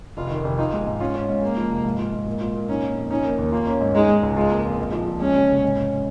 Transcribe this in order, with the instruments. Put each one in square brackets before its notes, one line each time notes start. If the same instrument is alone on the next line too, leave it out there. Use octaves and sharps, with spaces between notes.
[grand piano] F1 [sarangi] F4
[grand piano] D#3
F1
[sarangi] D#4 [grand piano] F4
[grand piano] G#3
G#2
[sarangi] C#4 [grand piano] F4
[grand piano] C#4
G#2
[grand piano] G#3 [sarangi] A#3
[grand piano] F3
F1
G#2
F4
G#2
A#2
F4
A#2
[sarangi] C#4 [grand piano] D#4
[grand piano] A#3
F2
[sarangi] C#4 [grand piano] D#4
[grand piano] A#3
D#2
[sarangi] A#3 [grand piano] F4
[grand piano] C#4
G#2
[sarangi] G#3 [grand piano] D#4
[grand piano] G#3
C#2
[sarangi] G#3 [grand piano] F4
[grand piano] A#3
F2
A#1
F3
A#1
[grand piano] G#3 [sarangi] C#4
[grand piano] C#3
F1
G#2
C#4